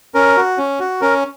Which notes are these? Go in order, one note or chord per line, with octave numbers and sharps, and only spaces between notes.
C#4 A#4
F#4
C#4
F#4
C#4 A#4